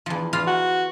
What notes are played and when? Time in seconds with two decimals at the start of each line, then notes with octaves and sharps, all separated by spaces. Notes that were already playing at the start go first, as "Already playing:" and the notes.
0.06 E2 F3
0.33 E2 F4 F5
0.47 F#4